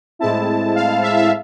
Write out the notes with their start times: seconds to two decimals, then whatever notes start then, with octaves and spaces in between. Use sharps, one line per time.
0.19 A2 G#3 C4 E4 A5
0.75 F5
1.02 E5
1.17 E5